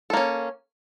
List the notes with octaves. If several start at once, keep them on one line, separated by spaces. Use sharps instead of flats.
A#3 C#4 A4